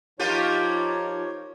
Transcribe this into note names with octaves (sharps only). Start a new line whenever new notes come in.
F3 A#3 D#4 F4 G4 C#5